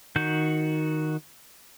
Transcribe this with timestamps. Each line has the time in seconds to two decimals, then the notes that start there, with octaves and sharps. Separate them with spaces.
0.16 D#3 F#4 G6